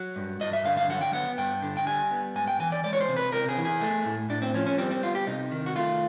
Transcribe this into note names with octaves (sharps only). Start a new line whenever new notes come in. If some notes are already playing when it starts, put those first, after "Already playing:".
Already playing: F#3
G2
G2 D#5
E5
D3 F5
F5
F#3 F#5
G5
B3 F#5
G2 G5
D3
G5
G3 G#5
B3
G#2 G#5
G5
E3 G#5
D5
G#3 D5
C#5
C5
C3
B4
C3 A#4
G#4
E3
G#4
A3
A2
A2 D4
C4
F3 C#4
C#4
G3 C4
C4
B3 F4
G4
C3 D#4
D#3
F#4
A3 F4